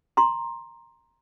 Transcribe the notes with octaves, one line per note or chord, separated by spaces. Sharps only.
A#5 C6